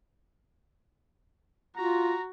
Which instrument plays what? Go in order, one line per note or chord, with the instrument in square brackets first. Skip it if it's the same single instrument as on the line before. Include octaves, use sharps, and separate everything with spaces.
[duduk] F4 [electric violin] F#4 [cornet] A#5